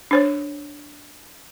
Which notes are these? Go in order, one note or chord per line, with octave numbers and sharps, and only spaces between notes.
D4 C5 C#5